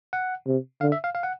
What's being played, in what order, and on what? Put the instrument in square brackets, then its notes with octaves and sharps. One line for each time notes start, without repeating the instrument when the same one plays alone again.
[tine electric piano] F#5
[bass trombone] C3
[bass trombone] D3 [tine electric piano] F5
[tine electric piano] E5
F5
F5
F#5